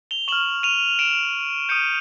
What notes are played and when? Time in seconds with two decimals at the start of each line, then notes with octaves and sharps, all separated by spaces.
0.11 F7 G7
0.28 C#6 F6 E7 F#7
0.63 D#7 F7
0.99 D7 E7
1.69 D#6 G6 C#7 D#7